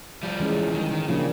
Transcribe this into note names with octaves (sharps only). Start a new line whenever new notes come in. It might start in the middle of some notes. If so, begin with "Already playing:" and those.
F3 G3
E3 G#3 C#4
D#3
D#3
C#3 F3 A#3 D4 G4